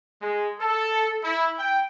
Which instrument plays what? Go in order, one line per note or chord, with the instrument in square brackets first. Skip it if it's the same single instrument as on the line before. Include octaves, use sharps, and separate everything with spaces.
[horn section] G#3
A4
E4
G5